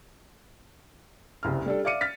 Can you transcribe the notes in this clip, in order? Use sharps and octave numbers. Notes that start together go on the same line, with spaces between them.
F#1 C2 F6
G3 D4 A4
D5 E5 F5 D6 C#7 D#7
F6 A6 B6